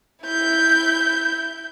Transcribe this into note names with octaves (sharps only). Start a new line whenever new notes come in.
E4 G6